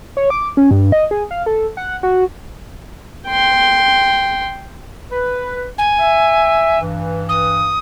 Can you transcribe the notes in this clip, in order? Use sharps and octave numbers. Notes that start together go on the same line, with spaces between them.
C#5
D6
C#4
G2
D#5
G#4
F5
A4
F#5
F#4
G5 C6
B4
G#5
E5
G2 E3
D#6